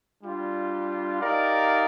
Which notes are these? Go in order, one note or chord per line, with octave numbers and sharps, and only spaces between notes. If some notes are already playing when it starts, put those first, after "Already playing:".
G3 D4 F4
D#4 G4 A#4 D5 F5